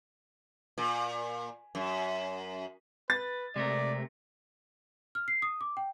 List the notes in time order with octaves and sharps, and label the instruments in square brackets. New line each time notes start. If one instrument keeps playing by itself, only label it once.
[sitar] A#2
F#2
[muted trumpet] B4 [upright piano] A6
[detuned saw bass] C3 [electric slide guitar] G#3 A3 A#4 [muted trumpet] D5
[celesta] F6
C7
D#6
D6
G5